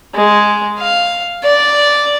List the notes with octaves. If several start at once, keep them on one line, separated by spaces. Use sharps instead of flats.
G#3
F5
D5